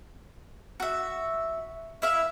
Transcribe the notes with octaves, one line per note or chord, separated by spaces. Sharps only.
F#4 E5
E4 E5 F5